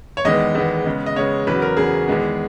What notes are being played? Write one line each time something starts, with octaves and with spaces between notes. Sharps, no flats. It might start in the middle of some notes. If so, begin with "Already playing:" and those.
C#5
E2 D#3 G#3 B3 D#5
E2 D#3 G#3 B3
C#3 G#3 B3
D#5
C#3 G#3 B3 C#5
E2 C#3 F#3 B4
A#4
E2 C#3 F#3 G#4
E2 D#3 G#3 B3